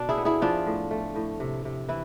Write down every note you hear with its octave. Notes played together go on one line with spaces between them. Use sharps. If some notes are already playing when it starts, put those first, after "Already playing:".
Already playing: B2 D4
E4 G#4
B3
E4 G#4
F3 D4 F4
A2
A3
A2
C3
C3
E3 E4